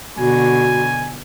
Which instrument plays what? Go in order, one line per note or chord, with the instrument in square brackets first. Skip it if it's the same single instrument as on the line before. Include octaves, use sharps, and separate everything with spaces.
[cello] B2 D3 [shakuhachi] F#4 [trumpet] G#5